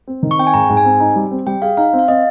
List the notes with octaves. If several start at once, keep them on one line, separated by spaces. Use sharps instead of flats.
C4
D#3
C#6
C4 G5
G#5
G#2 A#5
G#2
G#5
C4
D#4
G3
C4
G3 G5
G#4 F5
D#4 F5
C4
F5
C4 D#5